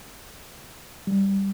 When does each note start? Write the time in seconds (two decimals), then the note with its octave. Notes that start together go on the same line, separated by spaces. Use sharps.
1.07 G3